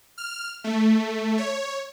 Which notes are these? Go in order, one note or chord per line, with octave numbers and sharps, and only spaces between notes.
F6
A3
C#5